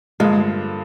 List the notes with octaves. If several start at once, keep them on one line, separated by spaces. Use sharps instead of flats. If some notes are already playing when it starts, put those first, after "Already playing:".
G2 D3 F3 G#3 A#3 F4